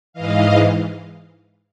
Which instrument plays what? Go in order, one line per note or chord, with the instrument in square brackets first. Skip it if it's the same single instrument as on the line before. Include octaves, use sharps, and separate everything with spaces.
[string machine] G#2 E3 D#5 F5